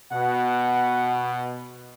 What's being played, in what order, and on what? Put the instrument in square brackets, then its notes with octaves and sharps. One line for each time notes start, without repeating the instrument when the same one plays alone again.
[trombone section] B2 [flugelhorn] F#5